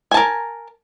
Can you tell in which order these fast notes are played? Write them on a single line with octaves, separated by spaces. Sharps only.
G#5 A5 A#4